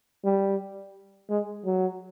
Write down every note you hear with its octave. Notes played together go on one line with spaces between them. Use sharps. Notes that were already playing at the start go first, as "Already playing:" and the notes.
G3
G#3
F#3